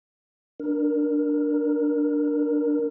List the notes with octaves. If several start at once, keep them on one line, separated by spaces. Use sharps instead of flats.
D4 A#4